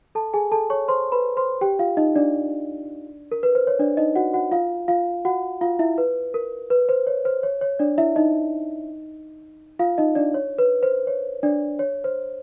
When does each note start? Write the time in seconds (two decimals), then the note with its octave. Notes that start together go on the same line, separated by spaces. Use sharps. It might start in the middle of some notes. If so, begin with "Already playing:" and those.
0.15 A4 A5
0.34 G#4 G#5
0.52 A4 A5
0.70 C#5 C#6
0.88 C5 C6
1.12 B4 B5
1.37 C5 C6
1.61 G4 G5
1.79 F4 F5
1.97 D#4 D#5
2.16 D4 D5
3.31 A#4
3.43 B4
3.55 C5
3.67 C#5
3.79 D4 D5
3.97 D#4 D#5
4.15 F#4 F#5
4.33 F#4 F#5
4.51 F4 F5
4.88 F4 F5
5.25 F#4 F#5
5.61 F4 F5
5.79 E4 E5
5.98 B4
6.34 A#4
6.70 B4
6.89 C5
7.07 C#5
7.25 C5
7.43 C#5
7.61 C#5
7.79 D4 D5
7.98 E4 E5
8.16 D#4 D#5
9.79 F4 F5
9.98 D#4 D#5
10.15 D4 D5
10.34 C#5
10.58 B4
10.83 C5
11.07 C#5
11.43 D4 D5
11.79 C#5
12.04 C5